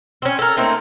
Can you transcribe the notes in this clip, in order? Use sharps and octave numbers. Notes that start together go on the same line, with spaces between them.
C4 C#4
A4 A#4
A3 A#3 C4 D#4